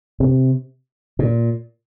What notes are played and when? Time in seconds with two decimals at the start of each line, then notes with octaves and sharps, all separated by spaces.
0.20 C3
1.19 A#2